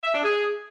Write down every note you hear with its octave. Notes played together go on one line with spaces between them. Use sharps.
E5
D4
G#4